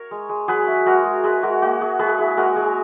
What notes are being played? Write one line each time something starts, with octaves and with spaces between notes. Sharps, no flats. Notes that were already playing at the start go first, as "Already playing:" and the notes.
Already playing: A#4 C#5
G#3
G#3
F#3 G#4 B4
E4
G#3 F#4 A#4
G#3
G#3 G#4 B4
G#3 F#4 A#4
A#3 F#4
E4 G#4
G#3 G#4 B4
E4
G#3 F#4 A#4
G#3 G#4